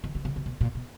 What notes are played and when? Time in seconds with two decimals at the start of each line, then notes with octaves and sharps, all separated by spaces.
0.04 D#3
0.15 D3
0.25 C#3
0.36 C3
0.46 B2
0.61 A#2
0.75 B2